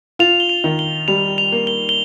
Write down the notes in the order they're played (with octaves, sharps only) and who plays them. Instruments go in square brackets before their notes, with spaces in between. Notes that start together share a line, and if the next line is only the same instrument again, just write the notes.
[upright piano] F4 [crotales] F7
[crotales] G7
F7
[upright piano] D#3
[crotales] G7
[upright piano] G3 [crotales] F7
[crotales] F7
[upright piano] A#3
[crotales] G7
G7